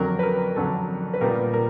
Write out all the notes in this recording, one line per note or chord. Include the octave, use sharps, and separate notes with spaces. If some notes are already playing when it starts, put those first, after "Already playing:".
Already playing: F2 D3 F#3 A#4
B4
A#4
F2 D3 F#3 A4
B4
A#2 G3 B3 A#4
A#4